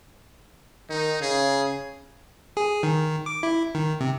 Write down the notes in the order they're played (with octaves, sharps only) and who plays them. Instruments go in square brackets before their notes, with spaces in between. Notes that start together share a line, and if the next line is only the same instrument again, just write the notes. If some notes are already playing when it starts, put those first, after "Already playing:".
[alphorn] D#3 [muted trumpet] D#4
[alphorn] C#3 [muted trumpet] G#4
[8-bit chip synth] G#4
D#3
D6
E4
D#3
C3